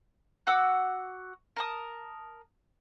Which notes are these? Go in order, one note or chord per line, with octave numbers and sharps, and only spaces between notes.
F#4 F#5 D6 E6
A#4 A5 D#6